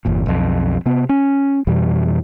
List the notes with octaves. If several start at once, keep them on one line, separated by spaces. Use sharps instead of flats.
G1 E2 A#2
B1 F2
C3 B3
C#4
F2 B2 E3 G3